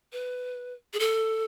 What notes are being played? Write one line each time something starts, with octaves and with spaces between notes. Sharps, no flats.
B4
G#4
A4